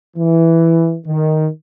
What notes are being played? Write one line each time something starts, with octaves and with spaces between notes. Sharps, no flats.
E3
D#3